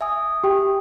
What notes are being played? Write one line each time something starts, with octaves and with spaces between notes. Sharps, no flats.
E5 G#5 D#6
G4 G5